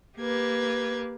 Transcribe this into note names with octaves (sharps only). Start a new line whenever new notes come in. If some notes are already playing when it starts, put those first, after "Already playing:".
A#3 G4 B4 G#6